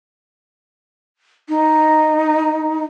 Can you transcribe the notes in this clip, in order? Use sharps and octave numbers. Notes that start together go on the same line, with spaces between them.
D#4